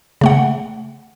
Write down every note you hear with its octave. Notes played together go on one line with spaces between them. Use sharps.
C#3 A3 F#5